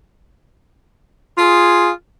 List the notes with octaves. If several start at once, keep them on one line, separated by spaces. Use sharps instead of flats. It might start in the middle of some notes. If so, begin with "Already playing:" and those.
F4 G#4